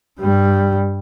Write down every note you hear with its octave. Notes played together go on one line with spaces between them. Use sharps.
G2 G3